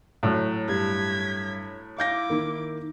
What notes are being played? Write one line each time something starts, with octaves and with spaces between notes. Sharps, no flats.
A2 F#3
G2 G#6 B6
E4 F5 D6 G6 A#6
D#3 A#3